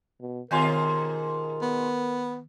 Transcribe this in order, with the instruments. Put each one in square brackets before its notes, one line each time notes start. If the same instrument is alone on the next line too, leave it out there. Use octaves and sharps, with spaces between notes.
[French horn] B2
[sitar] G#2 B2 F4 [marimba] D#3 G#5 C6 [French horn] A#4
[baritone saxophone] B3